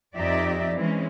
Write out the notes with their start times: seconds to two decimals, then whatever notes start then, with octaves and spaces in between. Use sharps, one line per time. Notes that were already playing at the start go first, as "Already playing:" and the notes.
0.16 F2 D#4 G4 D5 E5
0.76 E3 G#3 C4 C#4